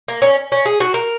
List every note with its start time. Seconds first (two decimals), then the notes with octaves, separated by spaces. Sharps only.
0.08 A#3
0.22 C#4
0.52 C#4
0.65 G#4
0.80 F#4
0.94 A#4